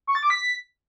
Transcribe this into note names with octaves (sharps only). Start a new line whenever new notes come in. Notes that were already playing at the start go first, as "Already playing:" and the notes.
C#6
A6
D6
B6